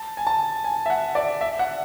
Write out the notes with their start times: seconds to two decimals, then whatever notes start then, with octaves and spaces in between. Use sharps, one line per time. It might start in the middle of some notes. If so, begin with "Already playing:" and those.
Already playing: A5
0.17 G#5
0.27 A5
0.64 G#5
0.86 E5
0.90 F#5
1.15 D5
1.41 E5
1.59 F#5